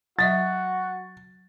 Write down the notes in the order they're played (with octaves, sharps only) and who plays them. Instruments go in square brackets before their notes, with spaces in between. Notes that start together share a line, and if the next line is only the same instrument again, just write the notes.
[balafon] F#3 D#5 E5 [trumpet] F#4 [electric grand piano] A6